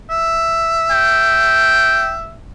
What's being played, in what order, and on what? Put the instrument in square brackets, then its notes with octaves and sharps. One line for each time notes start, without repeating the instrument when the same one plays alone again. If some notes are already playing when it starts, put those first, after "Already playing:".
[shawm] E5
[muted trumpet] G5